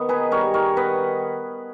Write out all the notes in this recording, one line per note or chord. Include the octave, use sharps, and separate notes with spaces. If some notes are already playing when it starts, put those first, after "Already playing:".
Already playing: D#3 B3
D#4 G#4 B4
G3 A#4 C#5
D#3 A#4 C#5
B3 B4 D#5